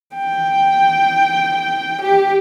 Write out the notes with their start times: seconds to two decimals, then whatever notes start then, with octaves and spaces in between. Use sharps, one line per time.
0.16 G5
2.02 G4